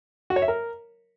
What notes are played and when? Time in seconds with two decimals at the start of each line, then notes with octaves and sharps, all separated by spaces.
0.30 F#4
0.36 C#5
0.42 E5
0.48 A#4